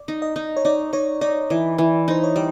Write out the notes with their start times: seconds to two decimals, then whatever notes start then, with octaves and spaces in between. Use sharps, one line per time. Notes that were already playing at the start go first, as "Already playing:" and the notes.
Already playing: D5
0.08 D#4
0.22 D#5
0.36 D#4
0.57 C#5
0.65 D#4 D5
0.93 D#4 C#5
1.21 D#4 D5
1.50 E3 D5
1.78 E3
2.08 D#4 C5
2.24 C#5
2.36 G3 D5